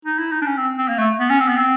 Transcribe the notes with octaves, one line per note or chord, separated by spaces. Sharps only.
D#4
E4
D#4
D4
C#4
C4
C4
A#3
A3
B3
C#4
C4
B3
C4